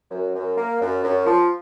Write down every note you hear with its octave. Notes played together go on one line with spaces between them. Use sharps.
F#2
F#2
A#3
F#2
F#2
F3